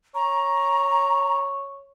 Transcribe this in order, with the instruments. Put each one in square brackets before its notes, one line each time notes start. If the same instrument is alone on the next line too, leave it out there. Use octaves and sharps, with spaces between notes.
[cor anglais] C#5 [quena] A#5